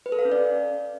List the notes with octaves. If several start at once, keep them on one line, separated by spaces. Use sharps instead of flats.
B4
A4
F5
C#4
D5